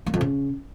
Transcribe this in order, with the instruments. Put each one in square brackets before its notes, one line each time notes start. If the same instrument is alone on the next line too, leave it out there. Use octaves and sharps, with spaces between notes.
[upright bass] A#3
F2
C#3